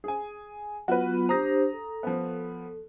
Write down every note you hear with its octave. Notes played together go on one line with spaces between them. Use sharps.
G#4 G#5
F#3 B3 F4 F#4 B4
D4 G4 C5 A#5 D#6 A#6
A4
F3 B3